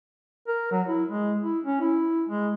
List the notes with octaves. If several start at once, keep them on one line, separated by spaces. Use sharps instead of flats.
A#4
F#3
E4
G#3
E4
C#4
E4
G#3